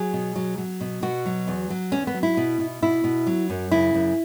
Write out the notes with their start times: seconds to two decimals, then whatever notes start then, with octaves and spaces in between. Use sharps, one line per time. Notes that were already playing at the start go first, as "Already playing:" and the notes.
Already playing: F#3 G#4
0.13 B2
0.36 F#3
0.58 F#3
0.81 B2
1.02 B2 F#4
1.26 F#3
1.48 E2
1.70 F#3
1.92 E2 C#4
2.07 B3
2.14 F#3
2.23 E4
2.37 B2
2.60 B2
2.82 B2 E4
3.04 B2
3.27 F#3
3.50 F#2
3.71 C#3 E4
3.94 F#2